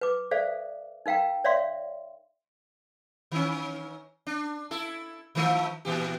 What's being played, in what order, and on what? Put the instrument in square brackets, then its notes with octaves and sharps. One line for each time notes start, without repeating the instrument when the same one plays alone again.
[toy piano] B4 D6
A4 C5 D5 E5 F5
D#4 A#4 F5 G5 A#5
C#5 D5 E5 F5 C6
[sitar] D#3 C#4
D4
E4 A4
D#3 F3 A3
A#2 E3 G4